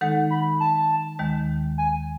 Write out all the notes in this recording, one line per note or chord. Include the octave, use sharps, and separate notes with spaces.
D#3 G#3 D#4 A4 F#5
B5
A5
D#2 D#3 G#3
G#5